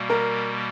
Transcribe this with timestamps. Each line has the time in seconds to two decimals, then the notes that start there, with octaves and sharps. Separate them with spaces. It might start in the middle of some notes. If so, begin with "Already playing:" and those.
Already playing: B2 G3 A#3
0.10 A#4